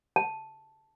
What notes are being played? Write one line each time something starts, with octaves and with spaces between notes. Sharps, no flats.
A5